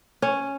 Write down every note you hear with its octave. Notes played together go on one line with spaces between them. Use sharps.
C#4